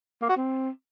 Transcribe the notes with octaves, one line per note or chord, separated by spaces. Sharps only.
A#3
F#4
C4